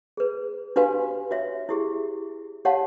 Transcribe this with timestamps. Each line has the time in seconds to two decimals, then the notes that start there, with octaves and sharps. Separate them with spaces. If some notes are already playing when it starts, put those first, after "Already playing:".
0.17 G#4 B4
0.76 D4 F#4 G4 B4 F5 G#5
1.31 F#4 C#5 E5
1.69 E4 G4 G#4
2.65 G4 C#5 F5 F#5 A5